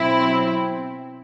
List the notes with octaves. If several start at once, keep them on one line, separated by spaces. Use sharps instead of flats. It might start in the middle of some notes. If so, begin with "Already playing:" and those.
Already playing: B2 F#3 C4 E4